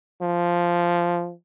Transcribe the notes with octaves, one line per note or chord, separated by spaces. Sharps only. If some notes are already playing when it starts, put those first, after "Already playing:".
F3